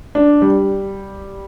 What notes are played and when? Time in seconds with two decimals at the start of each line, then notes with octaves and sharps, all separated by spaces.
0.15 D4
0.42 G3